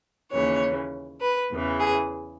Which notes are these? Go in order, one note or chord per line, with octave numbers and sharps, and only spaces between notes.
D#2 C#3 E3 C#5
B4
E2 C#3 E3
G#4